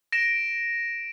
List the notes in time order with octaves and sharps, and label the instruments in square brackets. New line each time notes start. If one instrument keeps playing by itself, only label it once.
[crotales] A#6 D7 E7